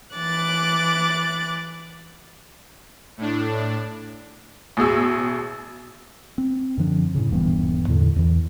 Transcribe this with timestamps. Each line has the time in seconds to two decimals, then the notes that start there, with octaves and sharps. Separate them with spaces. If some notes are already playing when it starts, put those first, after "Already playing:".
0.16 E3 D6 F#6 A6
3.17 A2 D4
4.77 A1 B2 G#4 E6
6.38 C4
6.78 F#2 D3 F3 D4
7.15 A2 C#3
7.31 D#1 G2 E3 B3
7.88 E2 A2 D3
8.16 E2 E3